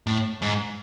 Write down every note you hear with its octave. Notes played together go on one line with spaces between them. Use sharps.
A2
G#2